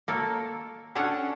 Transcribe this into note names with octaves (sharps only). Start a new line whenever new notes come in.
A#3 A4 C#5
C#4 D4 A4 C#5 F#5